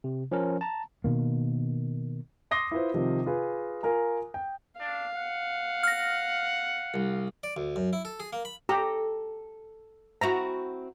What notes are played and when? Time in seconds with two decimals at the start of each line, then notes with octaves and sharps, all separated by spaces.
0.04 C3
0.32 F3 C#4 A#4
0.61 A5 A#5
1.04 B2 D#3 A#3
2.51 C6 D6 D#6 A#6 C7 G7
2.71 E4 F4 B4 C5
2.94 C3 D#3 F3
3.26 F4 G#4 B4
3.83 F4 A#4 G#5 A#5
4.34 G5
4.80 D4 F5
5.15 F#5
5.83 F6 A#6
6.94 C2
7.43 D5
7.57 D2
7.76 F#2
7.93 E4
8.05 A4
8.20 G#4
8.33 A#3
8.45 B5
8.69 G4 A4 A#5
10.21 C4 E4 F#4 A#5